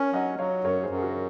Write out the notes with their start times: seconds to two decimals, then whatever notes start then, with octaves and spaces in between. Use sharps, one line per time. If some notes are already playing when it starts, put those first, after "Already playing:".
Already playing: C#4 A#4 C#5
0.13 F#3 D#5 F#5
0.38 F#3 C#5 F5
0.64 F#2 A#4 C#5
0.83 G#4 C5
0.90 F#2
0.98 G#4
1.02 F#4 A#4